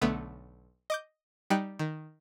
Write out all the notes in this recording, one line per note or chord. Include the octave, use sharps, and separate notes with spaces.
B1 D3 A3 B3
D#5 D6 G6
G3 D#4 G5 F#6
D#3